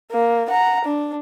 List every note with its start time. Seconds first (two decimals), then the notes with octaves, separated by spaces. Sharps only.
0.11 A#3
0.50 F#5 A#5
0.85 D4